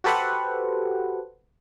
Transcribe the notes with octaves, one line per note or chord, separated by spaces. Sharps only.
F#4 G4 A4 B4 C5 F#5